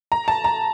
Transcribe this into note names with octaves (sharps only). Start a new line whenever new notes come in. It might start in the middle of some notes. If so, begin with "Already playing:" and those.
A#5
A5
A#5